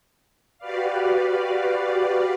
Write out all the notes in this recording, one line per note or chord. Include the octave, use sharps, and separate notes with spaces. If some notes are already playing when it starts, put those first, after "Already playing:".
F#4 G4 B4 D5 F5